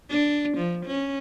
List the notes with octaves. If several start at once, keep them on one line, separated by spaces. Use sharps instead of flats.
D4
F3
C#4